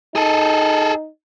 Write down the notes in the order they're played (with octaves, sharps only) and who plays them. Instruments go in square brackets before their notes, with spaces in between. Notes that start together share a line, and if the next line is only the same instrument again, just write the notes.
[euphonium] D#4 [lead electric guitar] G#4 A4